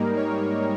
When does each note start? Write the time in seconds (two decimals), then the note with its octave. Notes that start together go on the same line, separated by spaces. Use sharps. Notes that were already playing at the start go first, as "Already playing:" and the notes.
Already playing: G#2 G3 A#3 D#4 A#4
0.16 C#5